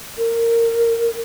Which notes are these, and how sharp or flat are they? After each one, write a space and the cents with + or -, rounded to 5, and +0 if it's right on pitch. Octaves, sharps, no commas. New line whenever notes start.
A#4 -15